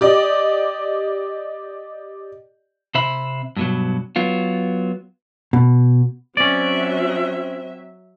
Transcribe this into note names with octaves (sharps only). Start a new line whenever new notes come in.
G4 D5 D#5
C3 C5 E5 B5
G2 B2 F#3
F#3 B3 F4
B2
F#3 C4 C#4 D5 E5